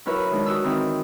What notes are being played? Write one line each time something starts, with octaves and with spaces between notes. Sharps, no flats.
F#3 E4 A#4 B4 C#5 E5
D#3 G#3 D4
F#4 D#6 E6
D#3 E3 C4